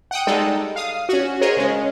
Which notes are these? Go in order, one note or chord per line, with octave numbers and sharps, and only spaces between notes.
F#5 G5 D#6
G3 G#3 D#4 A4
F5 D#6
C#4 F#4
G#4 A#4 C5 C#5 D#5
C#3 G#3 C#4